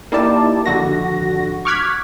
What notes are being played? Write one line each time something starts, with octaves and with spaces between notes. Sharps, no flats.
A#3 D#4 E4 G4 D5 A5
G#1 F2 D3 F#4 A#6
C#6 D6 F6 F#6 G#6 B6